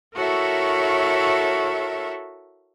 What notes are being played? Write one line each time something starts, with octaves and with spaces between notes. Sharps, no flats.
E4 F#4 A4 A#4 C#5 E5